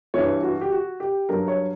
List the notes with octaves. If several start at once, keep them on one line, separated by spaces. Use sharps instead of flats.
G2 E3 C#5
F#4
G4
F#4
G4
G2 F#3 A#4
C#5